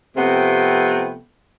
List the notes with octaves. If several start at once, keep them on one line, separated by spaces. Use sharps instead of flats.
C3 F3 A3 B3 C4 G5